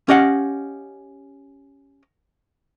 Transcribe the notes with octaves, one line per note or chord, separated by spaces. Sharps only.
C#4 G4 D#5 F5 F#5